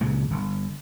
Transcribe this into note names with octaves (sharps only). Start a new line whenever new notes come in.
C#2 A#2 C#3 G#3
G1